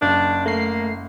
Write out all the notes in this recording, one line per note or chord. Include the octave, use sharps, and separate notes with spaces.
F#1 D4
A3 A#3 C7